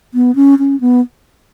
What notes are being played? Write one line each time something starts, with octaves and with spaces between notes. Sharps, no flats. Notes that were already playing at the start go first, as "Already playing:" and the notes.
B3
C#4
C#4
B3